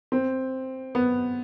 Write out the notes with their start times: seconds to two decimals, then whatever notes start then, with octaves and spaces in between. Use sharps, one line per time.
0.12 C4
0.95 B3